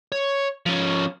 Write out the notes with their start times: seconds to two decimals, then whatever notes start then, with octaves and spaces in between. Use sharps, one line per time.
0.12 C#5
0.66 F3 C#4